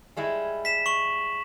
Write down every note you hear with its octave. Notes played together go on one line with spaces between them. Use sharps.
G3 G#3 E4
B6 E7
C#6 F#7